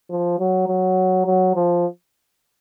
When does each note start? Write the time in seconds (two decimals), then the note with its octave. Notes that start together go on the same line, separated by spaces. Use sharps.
0.10 F3
0.40 F#3
0.68 F#3
1.26 F#3
1.55 F3